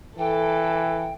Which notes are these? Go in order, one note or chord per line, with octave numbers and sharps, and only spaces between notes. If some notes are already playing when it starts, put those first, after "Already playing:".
E3 A4 G5